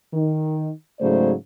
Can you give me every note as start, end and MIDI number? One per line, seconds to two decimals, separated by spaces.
0.13 0.69 51
1.00 1.32 44
1.00 1.32 49
1.00 1.32 54
1.00 1.32 57
1.00 1.32 72
1.00 1.32 74